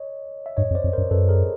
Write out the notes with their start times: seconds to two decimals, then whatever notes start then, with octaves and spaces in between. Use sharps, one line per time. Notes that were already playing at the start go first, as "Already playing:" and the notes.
Already playing: C#5 D#5
0.46 E5
0.57 G2 C#5 D#5
0.71 F2
0.75 C5 D5
0.84 F2
0.93 F#2 A#4 C5
1.11 F#2 A4 B4
1.29 G#4 A#4